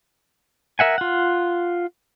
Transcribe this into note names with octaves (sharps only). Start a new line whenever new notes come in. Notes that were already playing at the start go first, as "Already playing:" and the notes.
A#4 E5 F#5 G#5
F4 F#5